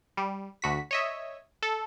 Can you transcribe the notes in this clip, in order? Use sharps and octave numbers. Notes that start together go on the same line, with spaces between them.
G3
D2 F#4 B6
C#5 D#5 E5
A4